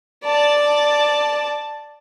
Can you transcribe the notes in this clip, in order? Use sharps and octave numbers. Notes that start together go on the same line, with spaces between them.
D5 A5